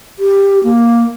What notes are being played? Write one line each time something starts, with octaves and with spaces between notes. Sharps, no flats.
G4
A#3